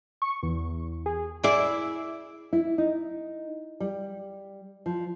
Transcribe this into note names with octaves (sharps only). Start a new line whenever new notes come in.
C#6
E2
G#4
E4 G#4 D5
E4
D#4
G3
F3